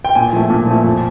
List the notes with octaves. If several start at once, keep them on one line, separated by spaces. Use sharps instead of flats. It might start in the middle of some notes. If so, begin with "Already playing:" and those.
G5
A#2 G#5
F3 A3
A#2
F3 A3
F2